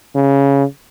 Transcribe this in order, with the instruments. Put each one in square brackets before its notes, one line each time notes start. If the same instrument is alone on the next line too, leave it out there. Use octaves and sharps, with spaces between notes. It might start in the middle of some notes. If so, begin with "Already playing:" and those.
[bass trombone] C#3